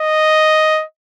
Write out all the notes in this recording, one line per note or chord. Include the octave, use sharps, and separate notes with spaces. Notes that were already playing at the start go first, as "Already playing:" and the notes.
Already playing: D#5